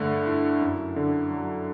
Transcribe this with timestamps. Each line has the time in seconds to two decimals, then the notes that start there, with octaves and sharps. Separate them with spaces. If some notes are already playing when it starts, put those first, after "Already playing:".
Already playing: G2 D3 A3
0.26 E4
0.61 F#2
0.96 D3
1.31 F#3